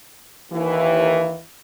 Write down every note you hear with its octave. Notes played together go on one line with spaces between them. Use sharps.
D#2 E3